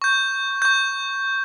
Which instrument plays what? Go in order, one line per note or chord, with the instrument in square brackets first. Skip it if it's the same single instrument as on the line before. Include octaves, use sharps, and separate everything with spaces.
[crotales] C#6 G6
C#6 G6